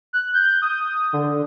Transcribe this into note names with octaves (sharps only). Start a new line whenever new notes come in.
F#6
G6
D#6
D3